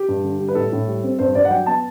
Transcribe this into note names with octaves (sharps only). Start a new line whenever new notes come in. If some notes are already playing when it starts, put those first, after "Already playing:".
Already playing: G4
G2
D3
G3
B4
A2 A4
A2
G3
C4
G2 C5
G2 D5
F#5
F#3 G5
B3 A5